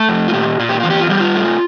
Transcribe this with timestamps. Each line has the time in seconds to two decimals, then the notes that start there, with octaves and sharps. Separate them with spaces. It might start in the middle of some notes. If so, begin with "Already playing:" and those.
Already playing: A3 A4
0.09 F2
0.28 F4
0.34 A#2 G4
0.59 A#2 F4
0.69 G4
0.80 E2 F4
0.90 G4
1.00 F4
1.09 G3 G4
1.20 F4
1.35 A3